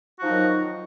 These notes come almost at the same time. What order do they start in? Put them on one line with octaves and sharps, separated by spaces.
F#4 F3 D#4 F#3 D#3